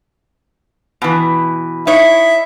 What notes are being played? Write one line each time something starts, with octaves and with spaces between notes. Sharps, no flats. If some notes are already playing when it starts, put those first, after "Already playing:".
B2 E3
D#4 E4 C#5 E5